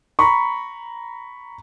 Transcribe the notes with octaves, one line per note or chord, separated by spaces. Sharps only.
A#5 B5 C#6